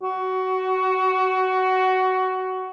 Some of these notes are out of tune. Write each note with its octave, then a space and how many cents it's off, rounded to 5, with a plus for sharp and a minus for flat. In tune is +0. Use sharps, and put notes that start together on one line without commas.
F#4 +15